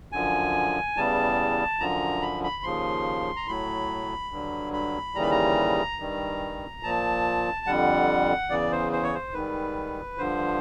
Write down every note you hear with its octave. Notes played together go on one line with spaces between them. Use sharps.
F#2 D3 F3 G#5
E2 C#3 E3 G3 A5
F#2 D3 F3 A#5
B5
B5
D#2 C#3 F3 C6
A#5
A2 F#3 B5
G2 D3 F#3
B5
D#2 C#3 E3 G3 A#5
B5
A#5
G2 D#3 G3
A#2 F3 A5
F2 D3 G3 F#5
E2 C#3 E3 D5
C5
C5
C#5
C5
G#2 D#3 G3 B4
G2 D3 F3 C5